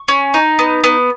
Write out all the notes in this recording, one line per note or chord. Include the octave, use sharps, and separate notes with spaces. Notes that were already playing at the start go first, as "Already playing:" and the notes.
Already playing: C#6
C#4
D#4
B3
B3